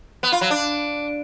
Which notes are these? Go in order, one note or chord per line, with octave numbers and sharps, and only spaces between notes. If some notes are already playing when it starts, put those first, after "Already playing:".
B3
F4
F#3
D4